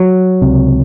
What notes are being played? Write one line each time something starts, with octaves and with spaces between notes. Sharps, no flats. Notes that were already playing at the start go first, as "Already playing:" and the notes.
Already playing: F#3
C#2 C3